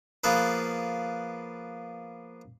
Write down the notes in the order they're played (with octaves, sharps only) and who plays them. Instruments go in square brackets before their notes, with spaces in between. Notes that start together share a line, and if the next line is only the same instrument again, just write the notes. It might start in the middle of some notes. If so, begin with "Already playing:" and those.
[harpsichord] F3 A#3 B3 G#4 A4 B4